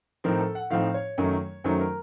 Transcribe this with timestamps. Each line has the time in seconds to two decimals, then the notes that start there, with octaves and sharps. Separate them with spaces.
0.24 A2 F3 C4 D#4 A#4
0.40 A4
0.55 F#5
0.70 A2 F3 C4 D#4 F5
0.94 C#5
1.18 F#2 D#3 F#3 A3 D#4
1.64 F#2 D#3 F#3 A3 D#4 C5
1.80 A#4